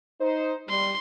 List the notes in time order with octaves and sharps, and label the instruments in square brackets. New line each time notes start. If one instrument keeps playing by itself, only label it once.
[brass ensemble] D#4 C5
[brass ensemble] G3 [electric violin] C6